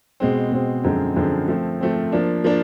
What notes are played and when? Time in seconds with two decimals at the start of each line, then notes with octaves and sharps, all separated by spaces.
0.20 B2 G#3 C4
0.51 B2 G#3 C4
0.84 F#2 D3 F3 G#3 C4
1.16 F#2 D3 F3 G#3 C4
1.48 F3 A3 C4
1.81 F3 A3 C4
2.12 F3 A#3 D4
2.44 F3 A#3 D4